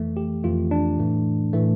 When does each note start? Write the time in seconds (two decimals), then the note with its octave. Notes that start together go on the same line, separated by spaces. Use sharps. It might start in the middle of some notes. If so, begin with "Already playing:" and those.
Already playing: F2 E3 A3
0.17 G4
0.43 F2 E3 A3 F4
0.71 D4
0.98 A2 E3 A3
1.53 A2 E3 A3